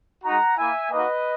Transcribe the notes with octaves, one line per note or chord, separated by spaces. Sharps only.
G#3 D#4 F#4 F#5 A#5
A#3 E4 E5 G#5
A#3 D#4 F#4 B4 D#5